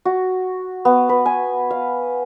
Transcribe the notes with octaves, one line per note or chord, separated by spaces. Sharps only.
F#4
B3
B4
G#5
F5